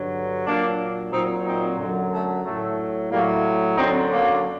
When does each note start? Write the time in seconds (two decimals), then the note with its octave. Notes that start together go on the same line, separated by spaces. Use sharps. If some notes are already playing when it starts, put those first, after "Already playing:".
Already playing: G2 D3 F#3
0.45 A#2 F#3 A#3 D4
1.11 A#2 F#3 C4 D#4
1.45 C4 D#4
1.78 F#2 D3 F#3
2.11 A3
2.44 A2 F#3 A3
3.10 A2 F#3 G3 A#3
3.77 F#2 D3 F#3 C4 D#4
4.10 A#3 D4